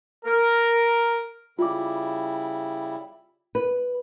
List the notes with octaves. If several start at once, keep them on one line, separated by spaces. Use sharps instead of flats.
A#4
C#3 G3 E4 F4 D6
B4